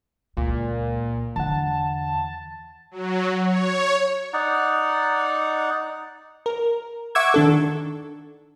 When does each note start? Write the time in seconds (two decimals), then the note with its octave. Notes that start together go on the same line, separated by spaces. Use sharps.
0.37 C#2 A#2
1.36 E2 D3 E3 F4 F#5 A5
2.91 F#3
3.45 C#5
4.33 D#4 D5 F#5
6.46 A#4
7.15 E5 F#5 C#6 D6 E6 G#6
7.34 D#3 D4 A4